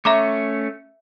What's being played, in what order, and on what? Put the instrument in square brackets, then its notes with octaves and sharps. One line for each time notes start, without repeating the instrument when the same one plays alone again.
[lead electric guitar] A3 C#4 [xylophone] E5 A#5 D6